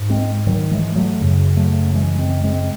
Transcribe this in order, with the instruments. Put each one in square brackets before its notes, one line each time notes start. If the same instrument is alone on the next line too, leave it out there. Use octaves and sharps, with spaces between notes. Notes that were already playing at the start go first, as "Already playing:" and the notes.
Already playing: [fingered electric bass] G#2
G#3 C4
D#3 F#3
E3 G#3
F#3 A3
F#2 C#3
F#3 A3
E3 G#3
G#3 C4
G#3 C4